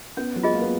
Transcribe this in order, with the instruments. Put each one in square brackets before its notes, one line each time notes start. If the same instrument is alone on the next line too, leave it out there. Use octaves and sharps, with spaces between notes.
[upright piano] B3 [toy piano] C#4
[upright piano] F#3
[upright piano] G#3 [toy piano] F4 G#4 D#5
[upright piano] A#3
B3